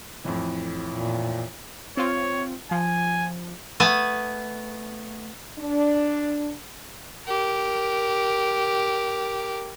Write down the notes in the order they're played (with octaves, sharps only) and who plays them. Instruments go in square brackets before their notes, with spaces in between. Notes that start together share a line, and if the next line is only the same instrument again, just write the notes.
[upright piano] F2 A2 E3
[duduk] A#2
[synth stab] C4 F4 [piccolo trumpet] C#5
[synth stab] F3 [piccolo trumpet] G#5
[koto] A3 B3 G#5 A5
[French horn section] D4
[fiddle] G4 A#4